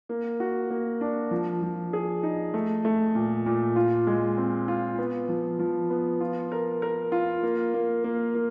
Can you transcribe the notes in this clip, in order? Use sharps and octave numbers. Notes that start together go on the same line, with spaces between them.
A#3
F#4
A#3
D4
F3
F3
G#4
D#4
A3
A3
A#2
A#2
F4
G#3
C4
F4
B3
F3
F3
B3
F4
A#4
A#4
F4
A#3
A#3
A#3
A#3